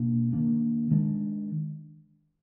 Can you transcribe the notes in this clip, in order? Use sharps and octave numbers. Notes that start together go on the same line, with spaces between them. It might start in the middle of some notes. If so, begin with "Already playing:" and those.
Already playing: B2 A#3 D4
D#3 A#3 D4
D#3 G#3 D4